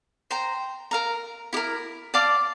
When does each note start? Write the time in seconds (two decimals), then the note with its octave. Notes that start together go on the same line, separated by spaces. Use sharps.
0.31 C5 G5 A#5
0.91 A#4 F5 A#5
1.53 E4 G4
1.57 A#4
2.14 D5 F5 A5 D6